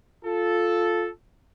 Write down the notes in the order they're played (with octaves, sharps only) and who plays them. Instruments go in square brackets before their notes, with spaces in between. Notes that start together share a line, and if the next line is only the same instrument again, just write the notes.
[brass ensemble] F4 A4